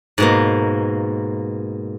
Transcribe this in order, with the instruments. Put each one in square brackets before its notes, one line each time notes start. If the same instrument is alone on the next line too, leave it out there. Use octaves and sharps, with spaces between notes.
[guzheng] G#2 B2 A#3